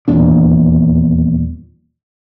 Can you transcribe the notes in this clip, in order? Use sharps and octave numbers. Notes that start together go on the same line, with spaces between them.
D#1 E2 A#2 D4